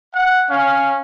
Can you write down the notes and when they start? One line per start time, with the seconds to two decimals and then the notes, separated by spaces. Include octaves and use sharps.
0.14 F#5
0.49 C#4 F5